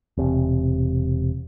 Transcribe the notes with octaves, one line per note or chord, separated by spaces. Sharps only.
E1 C3